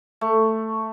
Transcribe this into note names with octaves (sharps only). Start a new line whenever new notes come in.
A3